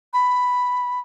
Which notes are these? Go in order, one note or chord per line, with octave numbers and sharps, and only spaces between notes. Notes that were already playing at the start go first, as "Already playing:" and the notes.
B5